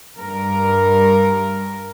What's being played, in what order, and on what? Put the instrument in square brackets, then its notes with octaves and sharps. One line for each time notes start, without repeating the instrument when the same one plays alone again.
[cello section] G2 A#4